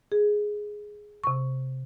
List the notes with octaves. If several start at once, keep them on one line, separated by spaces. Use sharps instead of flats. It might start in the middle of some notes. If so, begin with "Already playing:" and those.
G#4
C3 C#6